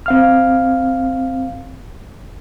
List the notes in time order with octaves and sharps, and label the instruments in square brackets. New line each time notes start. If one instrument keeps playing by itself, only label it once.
[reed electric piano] C4 F5 F6